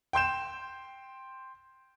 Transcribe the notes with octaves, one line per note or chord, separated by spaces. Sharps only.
G5 C6 G6 E7